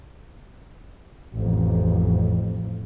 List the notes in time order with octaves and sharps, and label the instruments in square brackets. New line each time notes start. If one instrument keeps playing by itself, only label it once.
[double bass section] A1 F2